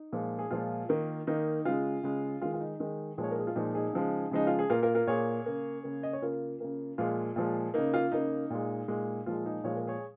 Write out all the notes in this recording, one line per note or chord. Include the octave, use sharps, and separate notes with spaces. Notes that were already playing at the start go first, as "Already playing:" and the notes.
Already playing: D#4
A#2 F3 G#3
G#4
A#2 F3 G#3 F4
D#3 A#3
D#3 A#3 D#4
C#3 G#3 F4
C#3 G#3
D#3 G#3 F4
F4
D#4
D#3 G#3
A#2 F3 G#3
C#5
A#4
G#4
F4
A#2 F3 G#3 D#4
D#4 G#4
C#3 F3 G#3
C#3 F3 G#3 D#4
F4
G#4
A#2 A#3 F4 A#4
F4 A#4
F4 A#4
A#2 A#3 G#4 C#5
C#3 A#3
C#3 A#3
D#5
C#5
C#3 A#3 F4 A#4
C#3 A#3
A#2 F3 G#3 F4
A#2 F3 G#3
C#3 A#3 D#4
F4
C#3 A#3 D#4
A#2 G#3
A#2 G#3
A#2 F3 G#3 F4
D#4 G#4
A#2 F3 G#3 C#5
A#4
G#4 C#5